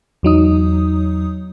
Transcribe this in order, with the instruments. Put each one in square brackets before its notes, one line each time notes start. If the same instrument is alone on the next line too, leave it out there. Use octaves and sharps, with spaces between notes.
[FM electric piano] E2 F#3 D#4 D#6